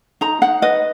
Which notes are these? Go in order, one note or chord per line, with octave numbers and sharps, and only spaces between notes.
D#4 A#5
D#4 F#5
B4 D#5